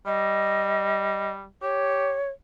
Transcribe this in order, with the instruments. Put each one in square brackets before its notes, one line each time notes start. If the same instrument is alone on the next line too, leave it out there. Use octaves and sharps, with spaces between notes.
[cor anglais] G3 [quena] D#5
[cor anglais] G4 [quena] C#5